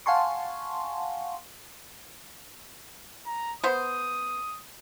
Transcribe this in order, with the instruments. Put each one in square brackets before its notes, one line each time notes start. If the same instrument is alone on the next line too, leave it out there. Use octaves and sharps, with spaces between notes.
[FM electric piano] F5 F#5 G#5 A5 C6 C#6
[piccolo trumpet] A#5
[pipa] B3 C5 [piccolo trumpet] D#6